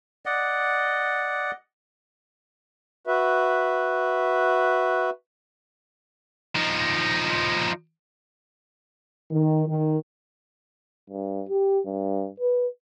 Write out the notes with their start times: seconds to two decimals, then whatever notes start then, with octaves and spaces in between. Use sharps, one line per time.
0.26 D5 D#5 F#5
3.07 F#4 B4 E5
6.55 F3 D#4
9.30 D#3
9.67 D#3
11.10 G2
11.49 G4
11.86 G2
12.40 B4